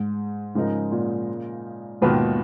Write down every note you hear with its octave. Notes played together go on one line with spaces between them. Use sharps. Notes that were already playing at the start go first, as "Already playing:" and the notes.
Already playing: G#2
G#2 C#3 F3 G#3 D#4 A#4
A#2
D#2 G#2 B2 D#3 A#3 F4 B4